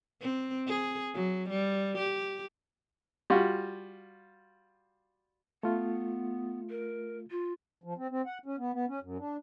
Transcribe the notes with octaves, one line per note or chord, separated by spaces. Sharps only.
C4
G#4
F#3
G3
G4
G3 F4 F#4
A3 B3 F4
A#4
F4
F3
C4
C4
F#5
C#4
B3
B3
C#4
F#2
D4